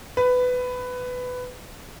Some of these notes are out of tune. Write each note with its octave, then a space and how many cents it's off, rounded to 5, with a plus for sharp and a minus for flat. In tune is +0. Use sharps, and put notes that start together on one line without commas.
B4 +15